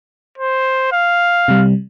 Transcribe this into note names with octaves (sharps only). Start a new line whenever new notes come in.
C5
F5
C3 G3